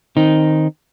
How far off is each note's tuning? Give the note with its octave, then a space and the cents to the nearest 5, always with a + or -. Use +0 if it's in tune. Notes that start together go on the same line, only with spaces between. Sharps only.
D#3 +0 C4 +10 D#4 +0